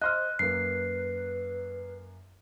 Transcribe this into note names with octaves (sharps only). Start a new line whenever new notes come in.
C5 D#5 C6 F6 F#6
F#2 A#3 B4 C7